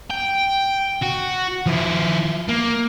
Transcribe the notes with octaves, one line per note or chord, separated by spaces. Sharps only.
G5
F#4
F3 E4
A#3